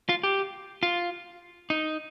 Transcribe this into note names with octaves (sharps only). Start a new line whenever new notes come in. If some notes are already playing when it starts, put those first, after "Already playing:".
F4
G4
F4
D#4